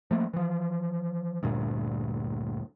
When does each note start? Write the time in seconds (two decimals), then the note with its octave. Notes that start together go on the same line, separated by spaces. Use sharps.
0.11 F3 A3 A#3
0.33 E3 F3
1.43 D2 G2 A#2